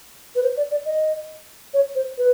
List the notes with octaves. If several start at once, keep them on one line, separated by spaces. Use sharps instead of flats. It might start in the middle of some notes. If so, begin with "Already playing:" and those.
B4
C5
D5
D5
D#5
C#5
C5
B4